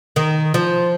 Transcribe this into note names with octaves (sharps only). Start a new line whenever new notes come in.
D#3
F3